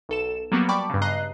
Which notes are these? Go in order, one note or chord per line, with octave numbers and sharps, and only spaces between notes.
B1 A4 E7
F#3 G3 A#3 B3 F#4
D5 G5 A5 B5 C#6 D6
G2 C#3
D#5 A#5 F#6 C7